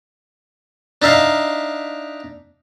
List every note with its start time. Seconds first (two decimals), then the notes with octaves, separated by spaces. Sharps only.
1.02 D4 D#4 E5 F5